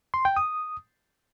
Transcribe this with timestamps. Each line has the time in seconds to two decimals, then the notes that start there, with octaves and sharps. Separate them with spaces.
0.14 C6
0.25 G5
0.36 D#6